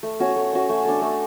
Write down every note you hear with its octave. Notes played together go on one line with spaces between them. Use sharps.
A3
C#4 F#4 C#5
A3
C#4 F#4 C#5
A3
D4 A4
A3